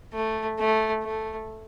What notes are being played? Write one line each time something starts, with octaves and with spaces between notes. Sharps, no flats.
A3
A3
A3